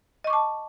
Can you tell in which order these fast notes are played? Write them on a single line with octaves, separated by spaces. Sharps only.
D#5 C#6 D6 A5